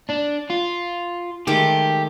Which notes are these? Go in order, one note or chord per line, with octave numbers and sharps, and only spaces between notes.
D4
F4
D#3 G#3 A3 G4